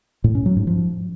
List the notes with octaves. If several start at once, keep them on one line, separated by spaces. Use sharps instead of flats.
A2
C#4
F#3
G#2
F3